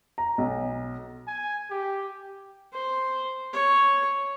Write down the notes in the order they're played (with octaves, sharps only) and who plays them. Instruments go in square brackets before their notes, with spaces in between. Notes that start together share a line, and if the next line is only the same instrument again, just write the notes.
[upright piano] A#5
B1
[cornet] G#5
G4
[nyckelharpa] C5
C#5